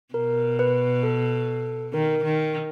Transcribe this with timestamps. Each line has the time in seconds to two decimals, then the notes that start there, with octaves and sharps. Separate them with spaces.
0.14 B2 A#4
0.59 B4
1.03 A4
1.93 D#3 A#4
2.24 D#3